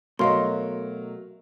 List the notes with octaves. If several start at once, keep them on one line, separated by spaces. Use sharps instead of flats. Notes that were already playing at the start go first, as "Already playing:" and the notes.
B2 F#3 A3 A#4 D#5 F5 C6